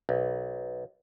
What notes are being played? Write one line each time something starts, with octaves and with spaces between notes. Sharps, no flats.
B1